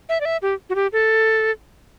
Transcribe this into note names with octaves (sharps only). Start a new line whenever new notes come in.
E5
D5
E5
G4
F#4
G4
A4